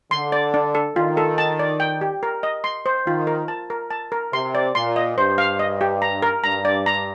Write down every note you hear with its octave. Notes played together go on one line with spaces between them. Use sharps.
D3 C6
D5
D4
A4
D#3 F4
A4
A5
D5
G5
G4
A#4
D#5
C6
C5
D#3 F4
A#4
A5
A#4
A5
A#4
C3 C6
D5
A#2 C6
D#5
G2 C5
F5
D#5
G4
A#5
A#4
G2 A#5
D5
A#5